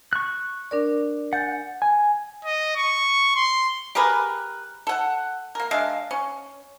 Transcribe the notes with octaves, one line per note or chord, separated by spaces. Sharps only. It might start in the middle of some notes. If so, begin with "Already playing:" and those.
C#6 F#6
D4 A#4 D5
F#5 G#5 G6 A6
G#5
D#5
C#6
C6
G4 G#4 A#4 B4
A4 F#5
A#3 A#4
G#3 D4 E5 F5
C#4